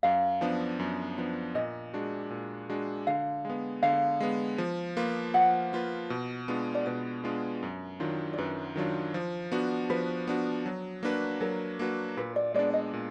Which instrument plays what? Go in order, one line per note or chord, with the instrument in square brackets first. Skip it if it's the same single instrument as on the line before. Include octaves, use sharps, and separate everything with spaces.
[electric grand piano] F#2 [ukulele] F5
[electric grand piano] F3 B3 D4
F#2
F3 B3 D4
[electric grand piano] A#2 [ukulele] D#5
[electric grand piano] G#3 D4 F#4
A#2
G#3 D4 F#4
[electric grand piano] D3 [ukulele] F5
[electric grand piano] G#3 B3
[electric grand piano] D3 [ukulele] F5
[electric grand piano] G#3 B3
F3
A#3 F4 B4
[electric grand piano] F3 [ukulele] F#5
[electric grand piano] A#3 F4 B4
B2
G#3 B3 D4 F4
[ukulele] D5
[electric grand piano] B2 [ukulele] B4
[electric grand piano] G#3 B3 D4 F4
F#2
D#3 F#3 D4 F4
[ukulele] D5
[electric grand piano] F#2 [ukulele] B4
[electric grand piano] D#3 F#3 D4 F4
F3
B3 D4 F#4
[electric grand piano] F3 [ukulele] B4
[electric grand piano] B3 D4 F#4
F#3
A#3 D4 F#4 B4
[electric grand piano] F#3 [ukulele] A#4
[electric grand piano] A#3 D4 F#4 B4
[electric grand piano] A#2 [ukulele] B4
[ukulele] D5
[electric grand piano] G#3 B3 D4 [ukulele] D5
[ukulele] D#5
[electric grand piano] A#2